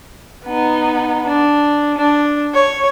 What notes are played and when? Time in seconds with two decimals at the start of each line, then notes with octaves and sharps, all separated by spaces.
0.45 B3 D#4
1.27 D4
1.98 D4
2.54 C#5